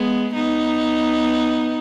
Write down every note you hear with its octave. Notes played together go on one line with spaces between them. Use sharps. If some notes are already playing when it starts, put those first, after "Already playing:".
Already playing: G#3 B3
B3 D#4